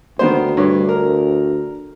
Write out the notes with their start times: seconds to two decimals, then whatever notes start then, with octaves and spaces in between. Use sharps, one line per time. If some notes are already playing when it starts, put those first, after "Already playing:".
0.19 D2 D#3 B3 C5
0.57 G2 C#5
0.89 A#4